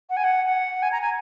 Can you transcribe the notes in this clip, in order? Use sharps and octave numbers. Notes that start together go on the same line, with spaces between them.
F#5
G#5
F#5
F#5
G#5
A#5
G#5